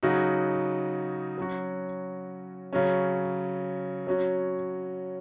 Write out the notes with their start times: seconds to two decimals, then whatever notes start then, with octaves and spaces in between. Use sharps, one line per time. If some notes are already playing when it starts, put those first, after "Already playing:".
0.03 C#3 F#3 D#4 F#4
1.38 F#3 C#4 F#4
2.73 C#3 F#3 C#4
4.07 F#3 C#4 F#4